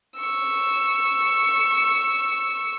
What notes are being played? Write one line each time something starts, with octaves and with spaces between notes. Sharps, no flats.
C#6 E6